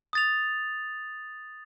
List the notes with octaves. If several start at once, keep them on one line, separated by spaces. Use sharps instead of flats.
D#6 A6 F7